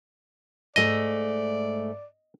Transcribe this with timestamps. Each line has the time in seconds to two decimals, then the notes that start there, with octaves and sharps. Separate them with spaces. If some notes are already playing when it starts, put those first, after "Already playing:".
0.76 G#2 A3 D5 D#5